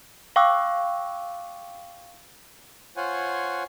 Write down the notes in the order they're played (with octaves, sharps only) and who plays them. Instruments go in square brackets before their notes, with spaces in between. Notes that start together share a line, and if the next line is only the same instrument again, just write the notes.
[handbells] F5 G5 C#6 D6 E6 F#6
[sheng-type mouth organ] F4 C5 C#5 F#5 G#5